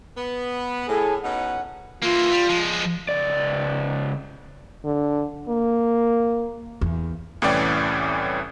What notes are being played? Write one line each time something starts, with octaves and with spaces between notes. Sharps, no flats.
B3
A2 G#4 A4 G#5
B2 C#4 D#4 F#5
E3 A#3 F4
G3
F3 G#3
C#2 D5
D3
A#3
E2
C2 A2 E3 C#4 D5 G5